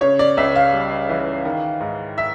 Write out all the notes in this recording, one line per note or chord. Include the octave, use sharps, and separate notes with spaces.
C#3 C#5
D5
C#2 E5
F5
G3
E3
D#3
G#2
E5